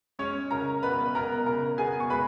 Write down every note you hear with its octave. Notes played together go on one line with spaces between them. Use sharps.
G#3 C#4 C#5
C#3 A#4 A#5
B3 B4 B5
B3 A#4 A#5
C#3 A#4 A#5
B3 G#4 G#5
C#6
G#3 B4 B5